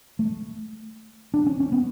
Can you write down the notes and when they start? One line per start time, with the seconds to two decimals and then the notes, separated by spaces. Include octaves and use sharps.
0.19 A3
1.34 D4
1.46 C#4
1.60 C#4
1.72 B3